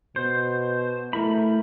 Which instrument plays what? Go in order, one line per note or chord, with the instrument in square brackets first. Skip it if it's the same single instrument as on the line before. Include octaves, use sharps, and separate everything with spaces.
[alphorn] B2 [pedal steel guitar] C5
[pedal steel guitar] A3 A#4 B5 [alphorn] E4